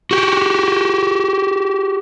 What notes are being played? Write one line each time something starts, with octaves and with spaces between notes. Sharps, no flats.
F#4 G4